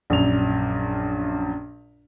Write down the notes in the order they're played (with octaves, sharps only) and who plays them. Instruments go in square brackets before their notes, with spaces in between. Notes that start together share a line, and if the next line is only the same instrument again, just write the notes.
[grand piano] A#1 F#2 F7